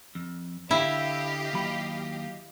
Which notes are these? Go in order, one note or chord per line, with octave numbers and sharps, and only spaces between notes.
F2
D3 E4 G4 D#5 F5
D#2 F#3 B5